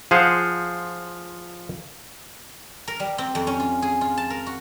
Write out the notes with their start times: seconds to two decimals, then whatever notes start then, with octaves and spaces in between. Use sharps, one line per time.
0.11 F3 G#4 C5 F5 F#5
2.88 A#4
3.00 G3
3.18 C4
3.35 F2
3.47 C#4
3.60 F4
3.82 G#4
4.01 F4
4.17 A5
4.30 A#4
4.46 F#4